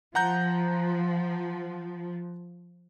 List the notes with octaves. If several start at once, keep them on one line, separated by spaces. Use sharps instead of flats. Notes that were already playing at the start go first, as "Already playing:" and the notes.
F3 F#5 A#5 G6